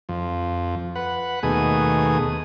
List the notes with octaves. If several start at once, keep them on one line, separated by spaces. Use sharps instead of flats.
F2
B4 F#5
D#2 B2 A3 G#4 D#6